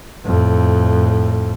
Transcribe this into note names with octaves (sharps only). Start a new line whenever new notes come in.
F2 A2